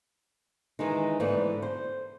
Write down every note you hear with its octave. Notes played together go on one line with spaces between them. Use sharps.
D#3 E3 G#3 D#4
G#2 D3 E3 A3 B3
C5